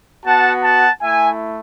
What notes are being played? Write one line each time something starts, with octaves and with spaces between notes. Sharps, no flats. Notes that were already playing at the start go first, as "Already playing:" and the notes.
B3 F#4 F#5 A5
F#5 A5
A3 E4 E5 G#5